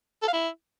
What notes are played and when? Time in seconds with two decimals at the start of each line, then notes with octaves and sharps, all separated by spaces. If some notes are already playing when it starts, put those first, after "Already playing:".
0.22 A4
0.28 F5
0.33 E4